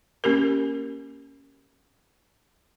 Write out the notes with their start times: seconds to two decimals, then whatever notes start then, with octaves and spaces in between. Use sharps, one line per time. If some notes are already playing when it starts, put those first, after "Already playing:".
0.24 A#3 C#4 G4 A#4